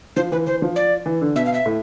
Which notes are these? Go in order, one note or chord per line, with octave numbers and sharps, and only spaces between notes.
F3 C5
E3 B4
E3 C5
F3
D5
E3
D3
B2 E5
F5
E5
A2